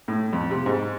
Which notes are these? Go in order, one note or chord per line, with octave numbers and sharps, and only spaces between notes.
A2
F2
C3
G#2